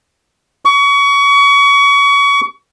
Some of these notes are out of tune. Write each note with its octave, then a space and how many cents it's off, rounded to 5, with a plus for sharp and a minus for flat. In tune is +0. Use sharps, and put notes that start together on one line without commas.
C#6 +30